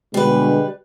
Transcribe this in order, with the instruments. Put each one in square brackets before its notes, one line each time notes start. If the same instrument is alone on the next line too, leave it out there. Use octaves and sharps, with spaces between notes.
[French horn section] B2 D3 G#3 [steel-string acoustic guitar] G3 B4